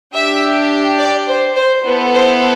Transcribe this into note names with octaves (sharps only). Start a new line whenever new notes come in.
D4 G4 E5
D5
C5
C5
B3 E4 A4 B4
C5